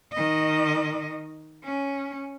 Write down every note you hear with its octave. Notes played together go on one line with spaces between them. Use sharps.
D#3 D#5
C#4